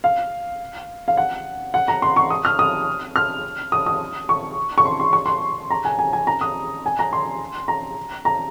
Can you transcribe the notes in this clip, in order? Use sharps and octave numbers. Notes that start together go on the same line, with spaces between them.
F5
F5
F#5
F#5
A#5
C6
C#6
D#6
F6
D#6
F6
D#6
D#6
C#6
C#6
C6
C6
C#6
C6
A#5
G#5
G#5
G#5
A#5
D#6
G#5
A#5
C6
A#5
A#5